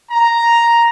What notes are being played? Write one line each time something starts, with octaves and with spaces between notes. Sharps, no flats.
A#5